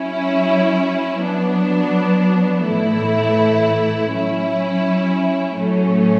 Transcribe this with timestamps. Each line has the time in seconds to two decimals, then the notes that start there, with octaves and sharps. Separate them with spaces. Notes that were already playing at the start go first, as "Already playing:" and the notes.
Already playing: F#3 C#4 E4
1.22 F#3 B3 D4
2.66 A2 E3 A3 E4
4.12 F#3 C#4 E4
5.56 A2 F#3 A3 C#4